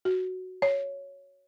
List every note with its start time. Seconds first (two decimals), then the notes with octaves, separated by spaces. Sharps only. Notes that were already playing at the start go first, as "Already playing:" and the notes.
0.05 F#4
0.62 C#5